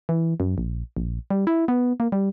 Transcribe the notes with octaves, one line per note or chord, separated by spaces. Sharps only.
E3
F#2
A#1
A#1
G3
E4
B3
A#3
G3